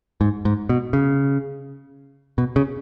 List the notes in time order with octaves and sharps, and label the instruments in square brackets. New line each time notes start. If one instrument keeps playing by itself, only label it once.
[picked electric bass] G#2
G#2
B2
C#3
B2
C#3